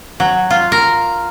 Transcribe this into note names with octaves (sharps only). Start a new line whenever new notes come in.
F#3
F4
A#4